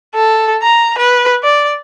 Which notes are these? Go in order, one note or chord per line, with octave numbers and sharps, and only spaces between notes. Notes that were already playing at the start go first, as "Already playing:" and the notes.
A4
A#5
B4
D5